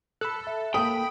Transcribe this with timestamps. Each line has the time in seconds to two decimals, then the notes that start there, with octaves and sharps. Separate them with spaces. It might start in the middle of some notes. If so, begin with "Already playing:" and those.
0.21 A4 B5 E6 F#6
0.47 E5
0.74 A#3 A4 G5 B5 D#6